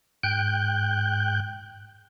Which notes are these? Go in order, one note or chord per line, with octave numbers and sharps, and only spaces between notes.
G#2 G5 F#6 G6